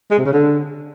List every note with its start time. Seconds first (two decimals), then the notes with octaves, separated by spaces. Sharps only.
0.11 G#3
0.18 C3
0.25 C#3
0.33 D3